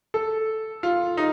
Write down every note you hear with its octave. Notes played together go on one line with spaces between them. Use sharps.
A4
F4
D#4